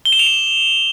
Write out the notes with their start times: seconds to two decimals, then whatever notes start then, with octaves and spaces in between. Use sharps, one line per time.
0.05 G7
0.12 E7
0.19 F7
0.26 E7